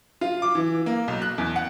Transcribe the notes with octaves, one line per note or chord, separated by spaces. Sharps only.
F4
D6
E3
A#3
B1
F#6
E2
F#5